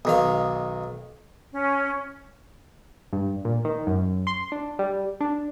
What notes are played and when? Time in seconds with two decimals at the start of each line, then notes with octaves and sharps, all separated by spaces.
0.05 B1 D#3 F5
1.52 C#4
3.13 G2
3.45 A#2
3.65 D#3
3.87 F#2
4.27 C6
4.52 D4
4.79 G3
5.21 D4